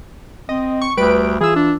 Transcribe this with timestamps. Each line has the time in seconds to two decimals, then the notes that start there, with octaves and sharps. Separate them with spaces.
0.49 C4 D#5
0.82 C#6
0.97 D2 G3 B4 D7
1.41 E3 F4 G#4 E6
1.56 D4